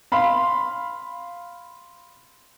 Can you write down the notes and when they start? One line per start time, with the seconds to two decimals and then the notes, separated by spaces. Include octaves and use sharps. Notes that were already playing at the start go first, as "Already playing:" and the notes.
0.12 F5 B5 C6